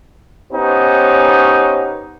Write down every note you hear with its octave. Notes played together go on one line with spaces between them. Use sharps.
B3 C#4 D#4 G4 C5 C#5